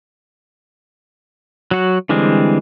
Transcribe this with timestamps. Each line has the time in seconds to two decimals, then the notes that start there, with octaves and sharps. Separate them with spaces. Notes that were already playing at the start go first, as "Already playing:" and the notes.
1.71 F#3 F#4
2.09 D3 E3 G3 G#3 C4